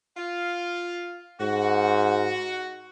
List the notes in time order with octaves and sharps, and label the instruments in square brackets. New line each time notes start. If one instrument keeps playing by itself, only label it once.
[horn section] F4 F5
[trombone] G#2 [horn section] F#4